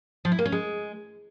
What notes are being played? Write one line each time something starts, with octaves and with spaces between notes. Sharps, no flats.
F3
E4
A#3
C#4
G#3